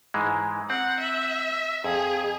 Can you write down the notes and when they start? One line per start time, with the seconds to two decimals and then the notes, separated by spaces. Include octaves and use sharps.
0.14 G#2 E3 G#3
0.70 C4 F#5
0.99 E5
1.84 F2 G#4